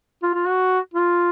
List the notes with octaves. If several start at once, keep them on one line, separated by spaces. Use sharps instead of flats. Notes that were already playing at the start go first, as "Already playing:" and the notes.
F4
F4
F#4
F4